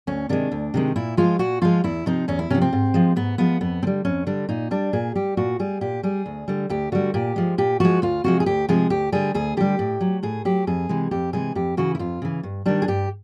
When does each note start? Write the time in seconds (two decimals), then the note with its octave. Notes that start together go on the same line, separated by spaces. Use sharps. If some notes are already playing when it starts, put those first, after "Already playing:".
0.07 D2 C#4
0.29 C3 D#3 G#3 D4
0.51 D2
0.74 C3 D#3 G#3
0.96 A#2 E4
1.17 F3 G#3 F4
1.39 A#2 F#4
1.62 F3 G#3 F4
1.84 E2 E4
2.06 C3 F3 D#4
2.28 E2 C#4
2.39 E4
2.50 C3 F3 C#4
2.62 C4
2.73 G#2
2.94 F3 G#3
3.16 G#2 B3
3.38 F3 G#3 B3
3.61 F2 B3
3.83 D3 G3 C4
4.05 F2 C#4
4.27 D3 G3 D4
4.49 A#2 D#4
4.71 G3 D4
4.93 A#2 G#4
5.15 G3 G4
5.37 A#2 F#4
5.60 G3 G#4
5.81 A#2 G4
6.03 G3 G#4
6.26 D2
6.48 D3 G3
6.69 D2 G4
6.92 D3 G3 F#4
7.14 A#2 G4
7.36 F3 G#3
7.58 A#2 G4
7.80 F3 G#3 F#4
8.02 D2 F4
8.24 C3 F3 G#3 F#4
8.40 G#4
8.46 D2 G4
8.68 C3 F3 G#3 G#4
8.90 D2 G4
9.12 D3 G3 G#4
9.34 D2 G#4
9.57 D3 G3 G4
9.79 A2
10.01 F#3
10.23 A2 G#4
10.45 F#3 G4
10.67 F2 G#4
10.89 C3 E3 G#3
11.11 F2 G4
11.33 C3 E3 G#3 G#4
11.55 F2 G4
11.77 C#3 E3 F#4
11.95 E4
11.99 F2 F4
12.22 C#3 E3
12.43 G2
12.66 D#3 G3 D4
12.82 G#4
12.88 G2 G4